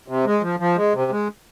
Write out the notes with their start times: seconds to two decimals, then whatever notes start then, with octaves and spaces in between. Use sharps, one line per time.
0.08 C3
0.25 G#3
0.42 F3
0.60 F3
0.77 G#3
0.94 C3
1.11 G#3